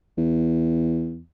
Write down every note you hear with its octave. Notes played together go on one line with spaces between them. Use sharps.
E2